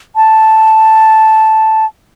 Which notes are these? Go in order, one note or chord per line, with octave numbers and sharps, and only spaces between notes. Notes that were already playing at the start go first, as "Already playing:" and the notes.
A5